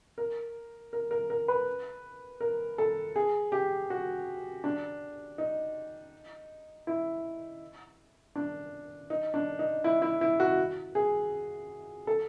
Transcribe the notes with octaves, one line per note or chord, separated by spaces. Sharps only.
A#4
A#4
A#4
A#4
B4
A#4
A4
G#4
G4
F#4
D4
D#4
E4
D4
D#4
D4
D#4
E4
E4
E4
F#4
G#4
A4